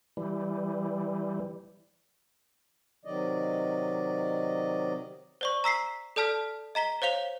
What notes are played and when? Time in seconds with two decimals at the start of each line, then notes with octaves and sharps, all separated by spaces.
0.17 E3 G3
3.05 C3 D#3 F#3 D5 D#5
5.41 C5 D5 C#6
5.64 A#5 E6 B6 C7
6.16 A4 D5 A5 F6 B6
6.75 D#5 A#5 B6 G7
7.02 C5 C#5 F5 F7 G7